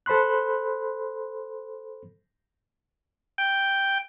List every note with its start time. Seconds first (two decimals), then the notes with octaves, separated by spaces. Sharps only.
0.06 A4 C5 B5 C6 F#6
3.38 G5